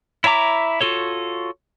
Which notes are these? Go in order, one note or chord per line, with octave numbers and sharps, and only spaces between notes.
E4 C#5 E5 A#5 D6
F4 F#4 A4 C#5